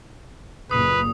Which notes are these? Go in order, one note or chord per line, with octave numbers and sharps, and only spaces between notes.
F#1 A#2 B4 D#6